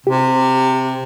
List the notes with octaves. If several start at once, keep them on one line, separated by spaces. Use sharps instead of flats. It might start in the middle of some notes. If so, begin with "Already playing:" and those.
C3 G4